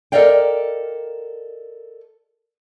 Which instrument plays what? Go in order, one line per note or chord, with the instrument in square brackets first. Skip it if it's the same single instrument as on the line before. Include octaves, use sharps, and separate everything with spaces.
[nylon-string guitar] A4 A#4 D5 D#5 F5 G5